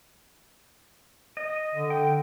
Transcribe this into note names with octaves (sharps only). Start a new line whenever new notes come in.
D#5
D3
G5